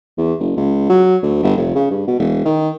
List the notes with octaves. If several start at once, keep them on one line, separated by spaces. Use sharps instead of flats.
E2
F#1
C#2
F#3
D2
G1
F1
C#3
G2
B2
E1
D#3